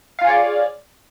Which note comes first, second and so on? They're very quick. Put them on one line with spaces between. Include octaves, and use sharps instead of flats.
F5 F4 G#4 C#5 D5